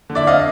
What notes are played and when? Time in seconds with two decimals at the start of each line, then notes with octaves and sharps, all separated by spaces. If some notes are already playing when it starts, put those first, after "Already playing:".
0.10 D3
0.15 D5 E5
0.27 C4 D#5 F5